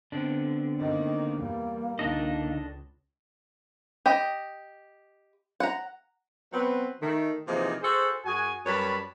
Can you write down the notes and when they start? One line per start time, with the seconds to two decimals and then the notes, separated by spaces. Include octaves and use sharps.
0.12 D3 B3 C4 D4
0.81 D#3 A#3 D#5
1.38 E2 G3 A#3
1.99 C#2 D3 D4 D#4 A4 D#5
4.06 G4 D#5
5.60 F#5 A#5
6.53 F#3 B3 C4 B4
7.02 D#3 A3
7.47 C3 E3 F3 A#3 D#4 G#4
7.82 F#4 G#4 A4 C5
8.25 F#2 F#4 G#4 G#5
8.66 F#2 G3 B4 C#5 A5 B5